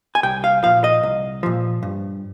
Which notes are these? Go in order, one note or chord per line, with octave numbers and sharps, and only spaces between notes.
G#5
C2 G5
F5
A#2 F3 F5
D#5
C2
A#2 F3
G2